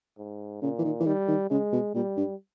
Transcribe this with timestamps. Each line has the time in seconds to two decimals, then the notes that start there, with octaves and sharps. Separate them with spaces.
0.18 G#2
0.62 A#2 C#3
0.78 E3
0.84 D#3
1.00 E3
1.06 D#3 G3
1.28 D#3
1.50 C#3 G#3
1.72 B2
1.95 A#2 G3
2.17 G2